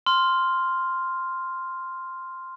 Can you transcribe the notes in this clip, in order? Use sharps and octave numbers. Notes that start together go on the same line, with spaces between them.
C6 F6